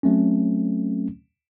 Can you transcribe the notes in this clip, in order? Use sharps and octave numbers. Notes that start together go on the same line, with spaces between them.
F#3 A3 C4 C#4